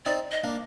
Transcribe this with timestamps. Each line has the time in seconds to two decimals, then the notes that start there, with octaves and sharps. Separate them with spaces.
0.05 C4 D#4 D5
0.31 D#5
0.44 A#3 D4